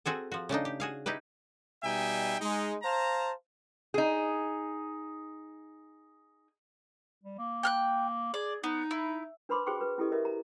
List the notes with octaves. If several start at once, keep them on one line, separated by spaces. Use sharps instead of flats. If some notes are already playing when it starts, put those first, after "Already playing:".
C4 F#4 G#4 A4
F3 F#4
C#3 A3 D4 D#4
G4
F#4 G#4 F5
D#4 E4 G4 B4
B2 G3 D#4 E5 G5 G#5
G#3 D#4
C5 F5 A5 A#5
D#4 G#4
G3
A#3
G5 F6 F#6
G#4 D5
B3 D#4
E4
D4 B4 C5 B5 C6 D6
F#4 G#4 C5 G5 C#6
B4
C#4 E4 G4 A4 D#5
A#4 C#5 D#5 E5
A#5